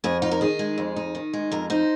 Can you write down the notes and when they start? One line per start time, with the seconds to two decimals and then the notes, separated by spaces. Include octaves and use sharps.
0.04 F2 G#4
0.22 D#4 F4
0.31 A#4
0.41 D#3 G#4
0.59 G#3
0.78 F2
0.96 D#4
1.15 D#3
1.33 G#3
1.52 F2 A#4
1.70 D#4 C5